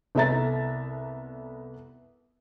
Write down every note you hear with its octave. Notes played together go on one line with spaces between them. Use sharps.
C2 B3 A4 E5 A#5 A6